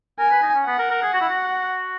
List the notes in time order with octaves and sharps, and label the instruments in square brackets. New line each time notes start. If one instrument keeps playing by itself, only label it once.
[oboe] A#4 [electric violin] G#5
[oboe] B4
D#4
C#4
[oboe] B3 [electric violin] F#5
[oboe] A#4
A#4
G#4
F#4
E4
F#4